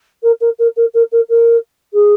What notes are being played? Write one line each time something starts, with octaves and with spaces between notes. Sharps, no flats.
A#4
A#4
A#4
A#4
A#4
A#4
A#4
G#4